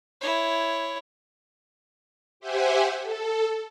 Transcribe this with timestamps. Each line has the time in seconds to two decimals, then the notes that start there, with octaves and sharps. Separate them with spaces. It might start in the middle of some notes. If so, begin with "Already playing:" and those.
0.21 E4 C#5
2.40 G4 C5 E5 F#5 G#5
3.01 A4